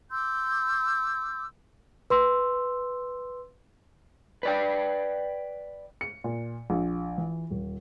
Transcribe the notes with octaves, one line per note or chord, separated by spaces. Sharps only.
C6 D6 E6 G6
B4 C6 E6
B4 D5 G5
C#7
A#2
A#1
E3
D#1